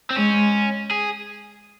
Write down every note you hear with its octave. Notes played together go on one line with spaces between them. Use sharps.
C4
G#3 C#4
G#4